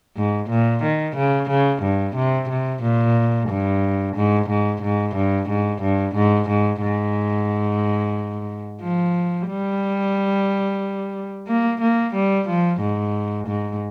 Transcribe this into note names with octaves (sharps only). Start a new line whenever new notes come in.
G#2
A#2
D#3
C#3
C#3
G2
C3
C3
A#2
G2
G#2
G#2
G#2
G2
G#2
G2
G#2
G#2
G#2
F3
G3
A#3
A#3
G3
F3
G#2
G#2